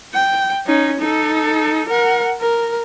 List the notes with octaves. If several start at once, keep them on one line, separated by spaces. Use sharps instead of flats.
G5
C#4 D#4
D#4 A4
A#4 F#5
A#4